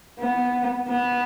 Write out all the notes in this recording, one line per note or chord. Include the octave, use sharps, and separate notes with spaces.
B3
B3